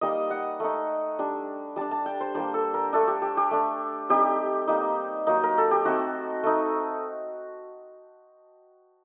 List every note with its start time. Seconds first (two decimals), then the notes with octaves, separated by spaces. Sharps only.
0.01 G3 A#3 D#4 D#5
0.30 F#5
0.60 A3 D#4
1.19 G3 D4
1.76 G3 D4 A5
1.91 A5
2.06 G5
2.21 C5
2.34 G3 A#3 D4 C5
2.54 A4
2.74 A#4
2.93 A3 D4 A4
3.08 G4
3.22 G4
3.37 G4
3.51 A3 D4
4.09 G3 C4 D#4 G4
4.67 G3 A#3 D#4
5.27 F#3 A#3 D#4
5.43 A#4
5.58 A4
5.71 G4
5.85 A3 C4 D#4 F#4
6.43 A3 D#4